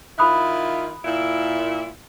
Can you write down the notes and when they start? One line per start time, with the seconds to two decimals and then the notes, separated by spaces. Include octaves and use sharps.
0.19 D#3 E4 F4 B5 D#6 F#6
1.05 A#2 E4